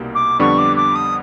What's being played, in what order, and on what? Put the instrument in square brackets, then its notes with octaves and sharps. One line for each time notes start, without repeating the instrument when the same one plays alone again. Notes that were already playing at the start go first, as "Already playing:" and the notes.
Already playing: [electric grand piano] C2 B2 G3 A#3 D#4
[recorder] D6
[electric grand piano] F2 D3 G3 B3 D4 [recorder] C#6
[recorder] D6
D6
D#6